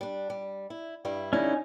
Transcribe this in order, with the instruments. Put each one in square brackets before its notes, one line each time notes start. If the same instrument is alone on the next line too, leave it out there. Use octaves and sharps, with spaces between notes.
[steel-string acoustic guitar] G3 D4
G3
E4
G2 G3 E4
[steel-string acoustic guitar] D3 G3 E4 [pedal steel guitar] C#4 D#4